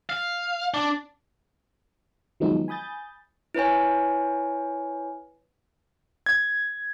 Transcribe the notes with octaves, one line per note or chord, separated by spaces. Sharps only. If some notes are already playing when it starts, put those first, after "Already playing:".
F5
D4
D#3 F3 F#3 G#3 B3 D#4
G#5 B5 D#6 G6 A6
E4 B4 C#5 G#5
G#6